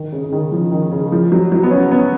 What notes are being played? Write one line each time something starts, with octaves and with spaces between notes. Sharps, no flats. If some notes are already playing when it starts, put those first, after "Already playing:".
Already playing: D#3
C#3
C#3
D#3
F3
D#3
C#3
F3
F#3
F#3
B3
C#4
B3